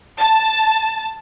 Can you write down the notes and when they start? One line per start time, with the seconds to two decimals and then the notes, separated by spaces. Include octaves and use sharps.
0.18 A5